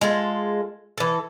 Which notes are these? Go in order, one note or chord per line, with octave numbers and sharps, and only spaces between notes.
G#3 F4 A4
E3 A4